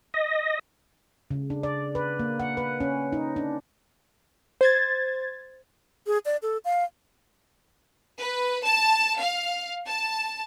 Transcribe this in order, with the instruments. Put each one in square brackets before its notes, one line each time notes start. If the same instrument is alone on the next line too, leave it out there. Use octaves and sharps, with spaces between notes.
[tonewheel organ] D#5
[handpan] C#3
D4
D5
B4
A#3
F#5
B4
C#4
D#4
D4
[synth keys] C5 G#6 A6
[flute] G#4
D5
A4
F5
[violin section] B4
A5
F5
A5